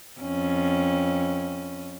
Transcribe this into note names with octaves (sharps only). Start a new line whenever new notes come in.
F2 C#4